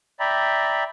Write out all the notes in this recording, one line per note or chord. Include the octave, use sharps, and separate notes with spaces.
D5 E5 G5 A#5 B5